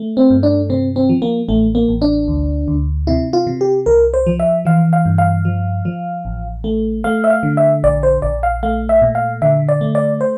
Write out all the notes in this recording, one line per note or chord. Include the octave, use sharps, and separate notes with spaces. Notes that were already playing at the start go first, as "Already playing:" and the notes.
Already playing: A3
C4
G2
D4
C3 C4
C4
F3
A#3
A1 A3
A#3
A1
D4
D2
D2
C3 E4
F4
C3
G4
C2 A#4
C5
F3
E5
E3 F5
F5
G2
F5
F3
F3
A1
A3
A3 F5
E5
F5
D3
E5
A#1 D5
C5
A#1 D5
F5
A3 F5
E5
A#2
F5
D3 E5
D5
A3
D5
C5